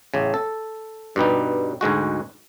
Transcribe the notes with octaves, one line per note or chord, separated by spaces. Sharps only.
A1 C#3
A4
G2 B2 G3 D#4
D2 G#2 G#3 F#4